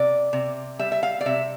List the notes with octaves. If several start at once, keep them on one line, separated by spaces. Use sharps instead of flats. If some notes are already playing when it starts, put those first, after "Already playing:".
Already playing: C3 D5
C3
G3 E5
E5
F5
D5
C3 E5